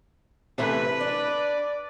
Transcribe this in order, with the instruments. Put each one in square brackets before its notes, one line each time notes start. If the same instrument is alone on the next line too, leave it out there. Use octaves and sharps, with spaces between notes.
[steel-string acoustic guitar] C3 E3 A3 [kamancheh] B4
[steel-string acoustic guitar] D4 [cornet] D5